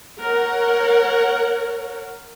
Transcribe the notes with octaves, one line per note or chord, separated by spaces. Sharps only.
A#4 C#5 F#5